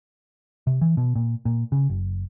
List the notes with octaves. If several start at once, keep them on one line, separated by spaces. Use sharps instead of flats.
C3
E3
B2
A#2
A#2
C#3
F#1